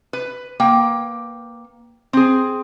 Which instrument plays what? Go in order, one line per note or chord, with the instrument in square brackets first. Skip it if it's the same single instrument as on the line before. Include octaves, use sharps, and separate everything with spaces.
[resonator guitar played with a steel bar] B4
A#3 G5
C4 G#4